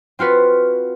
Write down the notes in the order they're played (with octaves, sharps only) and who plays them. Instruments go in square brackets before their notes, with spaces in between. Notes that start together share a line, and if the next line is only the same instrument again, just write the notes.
[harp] C4 F4 F#4 B4